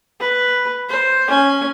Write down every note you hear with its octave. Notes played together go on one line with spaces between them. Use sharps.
B4
C5
C#4 G#5